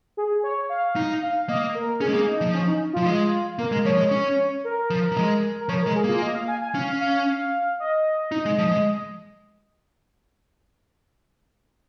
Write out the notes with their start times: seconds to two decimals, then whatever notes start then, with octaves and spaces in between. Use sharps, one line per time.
0.17 G#4
0.43 C#5
0.70 F5
0.96 D#4 F5
1.22 F5
1.49 A#3 D#5
1.75 A#4
2.01 C#4 G#4
2.08 G#3
2.14 A#3
2.27 D#4
2.41 F3
2.54 C#4
2.67 D#4
2.93 F3 F4
3.06 G#3
3.59 A#3 A#4
3.72 G#3
3.85 F3 C#5
3.98 G#3
4.11 C#4
4.64 A#4
4.90 F3
5.12 F3
5.17 G#3
5.60 A#4
5.69 F3 C#5
5.82 A#4
5.87 G#3
5.96 G#4
6.04 A#3 F4
6.22 D#5
6.35 F5
6.48 G#5
6.61 G#5
6.74 C#4 F5
7.01 F5
7.27 F5
7.80 D#5
8.32 D#4
8.45 G#3
8.58 F3
8.71 G#3